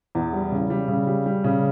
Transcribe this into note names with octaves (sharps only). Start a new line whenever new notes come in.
E2
G3
C#3
G3
C#3
G3
G3
C#3